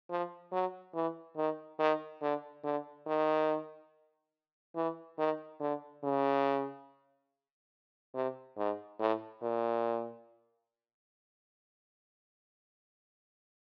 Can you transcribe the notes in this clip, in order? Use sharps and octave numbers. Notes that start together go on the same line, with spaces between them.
F3
F#3
E3
D#3
D#3
D3
D3
D#3
E3
D#3
D3
C#3
C3
G#2
A2
A#2